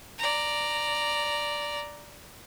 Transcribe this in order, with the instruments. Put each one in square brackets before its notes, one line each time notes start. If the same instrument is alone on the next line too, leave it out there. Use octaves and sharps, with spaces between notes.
[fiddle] D5 A#5